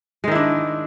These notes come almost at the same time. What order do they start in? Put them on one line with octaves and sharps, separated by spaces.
G#3 D#3 E4 D4